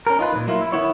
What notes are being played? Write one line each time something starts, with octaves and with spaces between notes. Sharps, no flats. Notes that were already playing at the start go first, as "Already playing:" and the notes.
C#4 A#4
D#4 F4 B4
D#2 A#2
F#3 A#3 E4 F4
E4
D#3 B3 E4 C#5